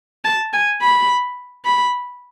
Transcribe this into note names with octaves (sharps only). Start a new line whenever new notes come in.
A5
G#5
B5
B5